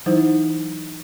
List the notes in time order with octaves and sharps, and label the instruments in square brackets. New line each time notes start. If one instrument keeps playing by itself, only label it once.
[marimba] E3 F#3 D#4 E4 C5